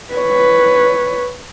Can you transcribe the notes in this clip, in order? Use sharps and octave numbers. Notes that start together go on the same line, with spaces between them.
B4 C#5